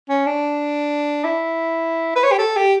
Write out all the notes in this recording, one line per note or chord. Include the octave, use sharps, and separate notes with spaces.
C#4
D4
E4
B4
C#5
G4
A4
G4